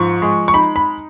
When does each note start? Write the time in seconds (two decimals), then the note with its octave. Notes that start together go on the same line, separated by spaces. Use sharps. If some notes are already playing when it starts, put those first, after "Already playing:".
Already playing: G#2 F3 C#6
0.22 G#3
0.48 C#6
0.54 D#4 B5
0.76 B5